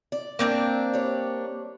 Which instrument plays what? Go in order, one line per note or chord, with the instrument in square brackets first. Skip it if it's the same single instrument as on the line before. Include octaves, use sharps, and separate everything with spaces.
[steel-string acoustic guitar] D5
[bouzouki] A#3 C4 D4
[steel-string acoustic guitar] G3 C#5